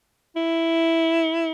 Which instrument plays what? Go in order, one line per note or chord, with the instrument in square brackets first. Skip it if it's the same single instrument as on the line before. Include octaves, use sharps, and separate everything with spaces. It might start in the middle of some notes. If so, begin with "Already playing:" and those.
[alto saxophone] E4